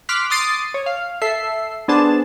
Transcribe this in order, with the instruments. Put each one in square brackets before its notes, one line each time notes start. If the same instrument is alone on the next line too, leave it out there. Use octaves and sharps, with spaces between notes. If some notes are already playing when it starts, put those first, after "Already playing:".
[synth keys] C6 D6 F6 F#6 B6
C6 D6 D#6 A6 C7 D7
C#5
F5
A4 E5 C7
B3 D4 G#4 C5 A5